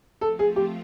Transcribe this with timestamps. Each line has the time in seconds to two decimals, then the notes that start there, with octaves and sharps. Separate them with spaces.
0.21 F3 A3 C4 F4 A4
0.39 G#4
0.56 G4